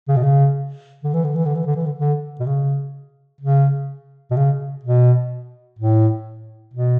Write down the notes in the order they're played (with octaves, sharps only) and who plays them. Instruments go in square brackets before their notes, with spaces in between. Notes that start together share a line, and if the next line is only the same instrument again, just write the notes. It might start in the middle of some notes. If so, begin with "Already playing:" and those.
[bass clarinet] C#3
B2
C#3
D3
E3
D3
E3
D3
E3
D3
E3
D3
D3
B2
C#3
C#3
B2
C#3
B2
A2
B2